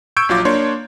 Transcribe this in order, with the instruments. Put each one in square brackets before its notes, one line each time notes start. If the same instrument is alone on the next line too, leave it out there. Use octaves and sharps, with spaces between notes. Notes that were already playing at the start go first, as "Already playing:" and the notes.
[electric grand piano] C#6 E6 G6 G#6 D7
A#1 F#3 F4 D6
A#3 D4 C#5 C6